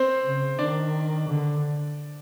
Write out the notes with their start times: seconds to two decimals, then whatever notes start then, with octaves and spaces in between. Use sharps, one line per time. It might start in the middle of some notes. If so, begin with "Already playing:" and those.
Already playing: C4 C5
0.24 C#3
0.59 D#3 D4 D5
1.29 D3